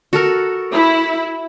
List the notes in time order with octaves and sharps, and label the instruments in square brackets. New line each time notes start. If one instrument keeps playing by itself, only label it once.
[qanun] F#4 A4 A#4
[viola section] E4